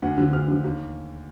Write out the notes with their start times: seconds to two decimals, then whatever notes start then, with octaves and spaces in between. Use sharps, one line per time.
0.02 D2 F#5
0.18 D3 F3
0.33 D2 F6
0.48 D3 F3
0.64 D#2